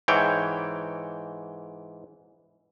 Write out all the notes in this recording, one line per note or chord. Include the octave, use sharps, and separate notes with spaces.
G#2 E3 C#5 G5